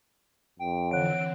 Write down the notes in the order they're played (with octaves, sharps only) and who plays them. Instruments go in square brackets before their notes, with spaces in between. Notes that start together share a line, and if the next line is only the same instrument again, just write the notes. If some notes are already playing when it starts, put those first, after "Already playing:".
[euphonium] F2 [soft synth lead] G5
[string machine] D3 E3 C4 [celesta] C#5 F#5 F#6 [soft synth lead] D7